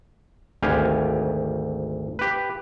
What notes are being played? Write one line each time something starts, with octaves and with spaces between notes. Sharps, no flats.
G#1 D2 G4 F5 G#5
G4 B4